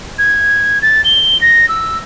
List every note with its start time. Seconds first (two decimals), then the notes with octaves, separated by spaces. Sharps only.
0.19 G#6
0.82 A6
1.05 G7
1.41 A#6
1.69 E6